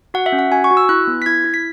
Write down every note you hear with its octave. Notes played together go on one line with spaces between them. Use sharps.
F#4 F#5
E5
C#4
F#5
F#4 G#5
C#6
F#4
E6
E4 F#6
B3
B6
E4 G#6
E4
B6